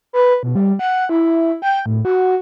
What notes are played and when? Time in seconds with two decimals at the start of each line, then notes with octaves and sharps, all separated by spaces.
0.13 B4
0.43 B2
0.55 G3
0.79 F#5
1.09 E4
1.62 G5
1.86 A2
2.05 F#4